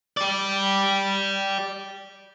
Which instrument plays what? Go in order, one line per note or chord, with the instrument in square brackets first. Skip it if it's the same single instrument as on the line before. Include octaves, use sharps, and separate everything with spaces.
[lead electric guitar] G4 D5